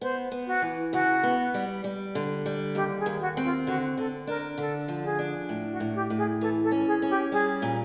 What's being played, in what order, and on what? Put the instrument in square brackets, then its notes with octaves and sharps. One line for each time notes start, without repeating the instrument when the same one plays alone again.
[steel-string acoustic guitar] B3 [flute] C5
[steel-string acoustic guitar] B3
[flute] F#4
[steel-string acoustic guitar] E3
[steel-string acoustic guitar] C#3 [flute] F#4
[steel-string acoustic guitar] B3
G3
G3
D3
G3
[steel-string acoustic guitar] D#2 [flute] G4
[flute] G#4
[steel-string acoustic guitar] D#2
[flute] F#4
[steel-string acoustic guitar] C4
[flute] F4
[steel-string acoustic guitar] D3 [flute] F#4
[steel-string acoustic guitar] D3 [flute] A4
[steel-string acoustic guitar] D4 [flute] A#4
[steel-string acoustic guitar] D3 [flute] A4
[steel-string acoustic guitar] F3
[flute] G#4
[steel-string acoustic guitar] D4
A2
[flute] F#4
[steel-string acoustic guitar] A2
[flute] G4
[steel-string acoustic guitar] A2
[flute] G#4
[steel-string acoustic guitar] E3 [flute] A4
[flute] A4
[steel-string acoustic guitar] C#4
[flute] G#4
[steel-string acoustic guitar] C#4
[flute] G4
[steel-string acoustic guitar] G3 [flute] G#4
[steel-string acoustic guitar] A#2